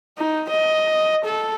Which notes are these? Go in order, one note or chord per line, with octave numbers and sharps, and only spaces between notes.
D#4
D#5
A4